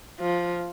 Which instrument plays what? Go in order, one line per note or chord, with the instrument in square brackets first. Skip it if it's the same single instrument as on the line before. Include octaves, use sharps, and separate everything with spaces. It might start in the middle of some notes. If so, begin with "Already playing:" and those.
[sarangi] F3